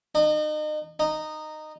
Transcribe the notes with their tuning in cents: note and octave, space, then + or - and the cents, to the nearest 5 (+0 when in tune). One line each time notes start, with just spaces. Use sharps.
D#4 -35
D#4 -15